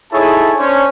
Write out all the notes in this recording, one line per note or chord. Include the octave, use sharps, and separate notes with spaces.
D#4 E4 G#4 A4 C#5 A5
C#4 D4 C5 C#5